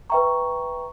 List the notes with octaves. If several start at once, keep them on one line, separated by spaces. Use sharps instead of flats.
B4 E5 G5 A#5 C#6